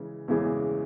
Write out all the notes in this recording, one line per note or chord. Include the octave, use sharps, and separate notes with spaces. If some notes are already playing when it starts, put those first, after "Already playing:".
Already playing: C#3 E3 G#3
E2 C#3 E3 G#3